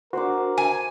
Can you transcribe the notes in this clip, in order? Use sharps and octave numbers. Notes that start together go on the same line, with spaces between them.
D4 F#4 A#4 C5 F#5 D6
G#5